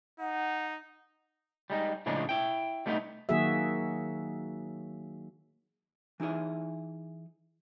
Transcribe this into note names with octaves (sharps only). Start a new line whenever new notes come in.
D#4 F#5
G3 G#3 D#4
A2 C#3 F3 G#3 D4 D#4
E4 G5
G3 A3 B3 D4 D#4
D#3 F#3 A#3 F#4 G#4 E5
E3 D#4 E4 G#4 E5